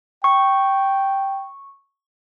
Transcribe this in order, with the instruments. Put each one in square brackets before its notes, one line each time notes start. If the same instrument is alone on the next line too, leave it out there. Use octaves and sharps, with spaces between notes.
[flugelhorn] G5 [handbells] C#6